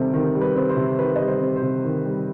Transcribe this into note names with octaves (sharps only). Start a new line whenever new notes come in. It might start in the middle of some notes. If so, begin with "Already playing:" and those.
Already playing: C3 D#3 G3 C4 A4
D#3
G3
B4
C4
C5
C3
D#3 B4
G3 D#5
C5
C4
C5
C3
D#3
G3